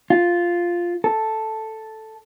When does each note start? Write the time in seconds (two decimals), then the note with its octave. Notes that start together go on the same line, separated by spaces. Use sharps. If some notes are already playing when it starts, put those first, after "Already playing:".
0.10 F4
1.04 A4